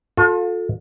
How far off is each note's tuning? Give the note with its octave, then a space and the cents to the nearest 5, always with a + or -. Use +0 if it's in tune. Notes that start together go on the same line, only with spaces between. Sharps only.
F4 +40 A4 +0